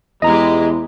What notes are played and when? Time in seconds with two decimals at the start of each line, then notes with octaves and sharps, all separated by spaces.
0.22 E2 E3 G#3 G4 D#5 A#5